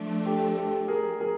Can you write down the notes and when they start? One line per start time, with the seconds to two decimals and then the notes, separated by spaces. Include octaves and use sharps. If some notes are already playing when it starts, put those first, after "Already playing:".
Already playing: F3 A3 D4
0.26 G4 A4
0.57 G4 A4
0.88 G#4 A#4
1.20 G#4 A#4